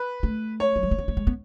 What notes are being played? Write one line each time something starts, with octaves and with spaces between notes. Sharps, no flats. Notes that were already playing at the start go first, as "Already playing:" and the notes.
Already playing: B4
A3
C#5
F#3
G#3
A3
B3
A3
G#3
B3